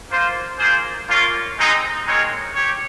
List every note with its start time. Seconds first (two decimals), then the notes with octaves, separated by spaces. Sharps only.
0.10 A#3 F4 C5 F5
0.59 A#3 F4 G#4 C5
1.08 A#3 C#4 F4 A#4 C#5
1.58 G#3 C4 D#4
2.06 G#3 C4 D#4 A#4 C#5
2.55 G4 C#5